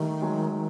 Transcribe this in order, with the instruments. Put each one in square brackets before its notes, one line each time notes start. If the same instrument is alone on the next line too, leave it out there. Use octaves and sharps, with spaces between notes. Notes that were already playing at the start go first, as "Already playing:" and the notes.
Already playing: [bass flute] D#3 [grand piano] G3 A3
[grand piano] F#3 G#3